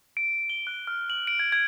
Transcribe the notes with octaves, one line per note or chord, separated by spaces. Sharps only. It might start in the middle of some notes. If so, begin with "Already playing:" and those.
D7
G7
F#6
F6
F#7
D7
G#6
G#6